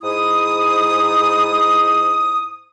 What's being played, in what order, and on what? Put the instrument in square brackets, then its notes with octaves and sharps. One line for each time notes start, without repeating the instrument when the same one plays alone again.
[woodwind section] G#2 E4 D#6